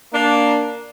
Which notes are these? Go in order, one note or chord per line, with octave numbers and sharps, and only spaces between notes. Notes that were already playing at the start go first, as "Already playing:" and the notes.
A#3 D4